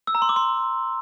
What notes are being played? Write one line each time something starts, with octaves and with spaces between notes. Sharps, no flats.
E6
A#5
C6
D6
C6